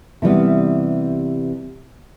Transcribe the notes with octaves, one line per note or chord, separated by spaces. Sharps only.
C3 E3 G3 B3